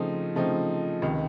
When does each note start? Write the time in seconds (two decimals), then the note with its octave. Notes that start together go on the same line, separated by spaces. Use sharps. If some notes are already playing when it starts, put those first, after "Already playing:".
Already playing: C#3 F3 A3 C4 D#4
0.35 C#3 F3 A3 C4 D#4
1.02 C#2 C3 D#3